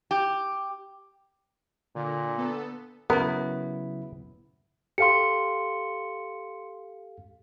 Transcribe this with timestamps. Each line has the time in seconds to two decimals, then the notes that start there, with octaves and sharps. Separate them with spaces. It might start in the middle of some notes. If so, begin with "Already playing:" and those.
0.11 G4
1.96 A#2 D3
2.38 B3 A4
3.10 C#3 F#3 B3 E4 A#4
4.98 G4 A4 F5 C6 C#7